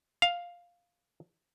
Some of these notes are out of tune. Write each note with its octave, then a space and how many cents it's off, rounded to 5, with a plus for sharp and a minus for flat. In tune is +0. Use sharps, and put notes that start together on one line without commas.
F5 +5